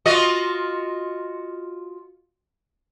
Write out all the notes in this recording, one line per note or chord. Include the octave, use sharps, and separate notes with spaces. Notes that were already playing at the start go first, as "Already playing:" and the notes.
F4 F#4 D#5